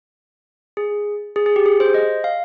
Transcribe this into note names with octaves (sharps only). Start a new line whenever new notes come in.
G#4
G#4
G#4
G4
G#4
C5
D#5
F5